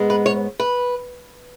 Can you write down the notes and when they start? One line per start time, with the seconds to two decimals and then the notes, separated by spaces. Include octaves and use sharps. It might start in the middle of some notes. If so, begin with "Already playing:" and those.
Already playing: G#2 G#3 B3
0.10 B4
0.26 C#5
0.60 B4